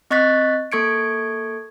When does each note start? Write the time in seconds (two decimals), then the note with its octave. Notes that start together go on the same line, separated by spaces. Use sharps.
0.11 C4 D#5 C#6 F#6 A6 B6
0.72 A#3 A4 C#6 G#6 C#7 D7